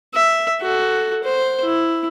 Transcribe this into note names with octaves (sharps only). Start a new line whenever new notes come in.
E5
F#4 A4
C5
E4